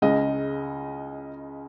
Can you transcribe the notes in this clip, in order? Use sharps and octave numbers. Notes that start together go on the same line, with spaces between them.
C#2 C#3 G#3 D#5